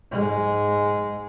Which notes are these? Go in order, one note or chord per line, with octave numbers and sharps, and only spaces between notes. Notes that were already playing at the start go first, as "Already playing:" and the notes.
G#2 G#3